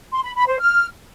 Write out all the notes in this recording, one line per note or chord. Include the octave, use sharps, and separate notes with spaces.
C6
B5
B5
C5
F6